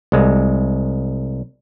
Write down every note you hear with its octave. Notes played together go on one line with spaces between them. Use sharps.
C2 G#3